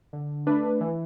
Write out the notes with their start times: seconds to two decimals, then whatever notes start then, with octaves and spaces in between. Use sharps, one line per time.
0.13 D3
0.47 A3 D4 B4
0.81 E3